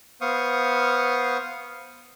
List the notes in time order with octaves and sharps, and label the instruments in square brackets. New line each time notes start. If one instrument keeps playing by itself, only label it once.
[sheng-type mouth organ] B3 C5 F5 C#6 D#6